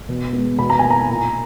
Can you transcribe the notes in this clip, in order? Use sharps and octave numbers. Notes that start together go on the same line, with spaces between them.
B2
G#3 B3
B2 B5
A#5
A#3 G#5
A#5
A#2